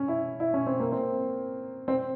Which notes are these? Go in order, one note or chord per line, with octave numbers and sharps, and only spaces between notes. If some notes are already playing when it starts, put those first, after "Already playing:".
Already playing: C#4
E4
E4
C#4
C4
A#3
C4
C4